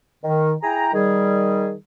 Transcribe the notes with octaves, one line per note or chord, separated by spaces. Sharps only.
D#3
E4 G#4 G5 A#5
D#3 G3 G#4